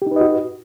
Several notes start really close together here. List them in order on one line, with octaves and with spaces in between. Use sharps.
G4 D#4 B4 D#5 F#4